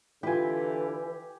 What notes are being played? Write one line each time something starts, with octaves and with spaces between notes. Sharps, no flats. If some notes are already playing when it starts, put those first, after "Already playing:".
D3 E3 E4 F4 G4 G#5